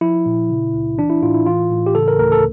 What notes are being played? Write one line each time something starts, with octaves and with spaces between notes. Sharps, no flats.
F3 E4
A#2
C#3
C#2
E3 D4
E4
A2 F4
E4
E3 F4
A2
G4
C#3 A4
A#4
D2 A#4
A4